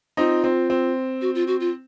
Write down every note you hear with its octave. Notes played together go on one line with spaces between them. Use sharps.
C4 D#4 F4
C4
C4
F#4
F4
F#4
F4